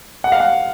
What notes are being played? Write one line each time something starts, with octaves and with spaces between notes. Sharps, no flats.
F#5
F5
F#5